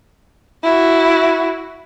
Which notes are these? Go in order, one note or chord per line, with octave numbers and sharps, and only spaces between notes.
E4 F#4